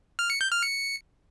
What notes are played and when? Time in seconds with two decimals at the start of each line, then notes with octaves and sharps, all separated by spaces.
0.19 F6
0.30 C#7
0.41 G6
0.52 F6
0.63 C#7